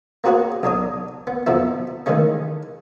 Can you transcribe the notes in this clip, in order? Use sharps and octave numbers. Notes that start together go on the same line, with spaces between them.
A#3 C4 F#4 G#4 B4 C#5
B1 D4 C#5 D#6
B3
F2 B2 F3 B3 E4
D#3 E3 G#3 A3 C#4